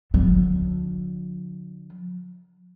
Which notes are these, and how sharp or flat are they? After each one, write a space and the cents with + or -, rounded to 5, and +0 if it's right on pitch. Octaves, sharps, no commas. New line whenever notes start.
D3 +0 F#3 -45